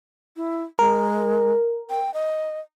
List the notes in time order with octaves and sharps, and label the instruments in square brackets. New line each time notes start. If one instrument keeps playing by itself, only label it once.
[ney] E4
[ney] G#3 [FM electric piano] A#4
[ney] G5
D#5